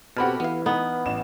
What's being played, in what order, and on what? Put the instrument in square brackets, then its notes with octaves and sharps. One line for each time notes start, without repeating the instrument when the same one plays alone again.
[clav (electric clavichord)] B2 C4 [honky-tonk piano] F#4 G4 A4 [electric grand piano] F#5 B5 F6
[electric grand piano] E3 E4 [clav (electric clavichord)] B3 F5 [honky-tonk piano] B4
[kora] B3 [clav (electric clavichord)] D#4
[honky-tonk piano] A1 E7